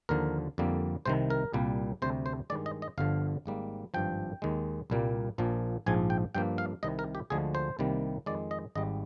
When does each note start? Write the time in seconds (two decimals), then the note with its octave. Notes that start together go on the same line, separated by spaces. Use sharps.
0.09 D#2 D3 F3 A#4
0.58 F2 D3 G3 A#3
1.06 C2 C3 D#3 C5
1.30 A#4
1.54 C2 A#2 G3 A#3
2.02 D2 C3 G3 C5
2.26 C5
2.50 G2 D#3 G#3 D5
2.66 D#5
2.82 D#5
2.98 G1 G2 D3 F3 F5
3.46 G#1 G#2 G3 A#3
3.94 G#1 G2 F3 G5
4.42 D#2 D#3 G#3
4.90 C2 A#2 G3 A#3
5.38 A#1 A#2 F3 A#3
5.86 A#1 G#2 F3 G#3 G#5
6.10 G5
6.35 G2 F3 A#3 G5
6.58 F5
6.83 C2 C3 D#3 D#5
6.99 A#4
7.15 G4
7.30 D2 D3 F3 G#3 G#4
7.55 C5
7.79 C2 C3 D#3 G3 A#3
8.26 F2 D#3 G#3 D5
8.51 D#5
8.75 G#1 G#2 G3 D#5